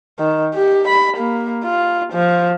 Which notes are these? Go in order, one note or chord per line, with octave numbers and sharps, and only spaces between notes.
D#3
G4
B5
A#3
F4
F3